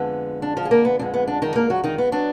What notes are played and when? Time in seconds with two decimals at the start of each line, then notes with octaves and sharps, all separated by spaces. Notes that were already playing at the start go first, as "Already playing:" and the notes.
Already playing: F2 D3 G#3 B3
0.42 D4
0.57 F3 F4
0.65 G#4
0.71 A#3 A#4
0.85 B3
0.99 F2 D3 G#3 B3 D4
1.14 B3
1.27 D4
1.42 D#3 D#4
1.55 A#3 A#4
1.70 F#3 F#4
1.84 D#3 D#4
1.98 B3
2.12 F#3 B3 D4